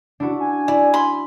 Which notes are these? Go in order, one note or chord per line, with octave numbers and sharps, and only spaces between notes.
D4 E4 F#4
G#5
E4 D5
B5 C6